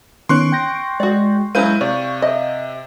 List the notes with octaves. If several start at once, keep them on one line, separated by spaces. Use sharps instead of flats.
D#3 B3 C#4 C6 C#6 F#6 D7
G5 G6 A#6
G#3 F#4 D5
F#3 G#3 C#4 E4 B4 F5 G6 D#7
C3 D5 C#6
D#5 E5